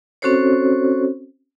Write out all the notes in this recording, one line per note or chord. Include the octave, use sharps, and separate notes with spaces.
C4 C#4 F#4 A4 C5 C#5